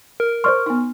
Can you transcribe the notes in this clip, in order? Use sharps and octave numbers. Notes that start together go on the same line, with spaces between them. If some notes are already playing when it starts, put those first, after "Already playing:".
A#4
C5 D5 C6 C#6 F6
B3 D#4